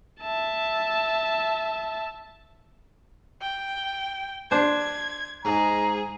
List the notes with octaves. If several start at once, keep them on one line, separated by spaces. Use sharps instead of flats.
E5 A5
G5
D4 C5 G#6
G#2 G#4 A#5